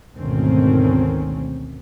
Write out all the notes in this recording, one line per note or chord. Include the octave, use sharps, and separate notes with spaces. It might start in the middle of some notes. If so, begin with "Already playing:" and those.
G#1 D2 B2 D#3 C4 C#4